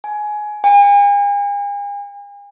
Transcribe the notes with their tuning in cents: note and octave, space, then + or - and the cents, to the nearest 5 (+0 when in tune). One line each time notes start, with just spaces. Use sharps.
G#5 +15
G#5 -40